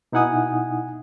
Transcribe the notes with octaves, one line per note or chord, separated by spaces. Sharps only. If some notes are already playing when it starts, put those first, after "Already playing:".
B2 D#4 E4 F#5 G#5 D#6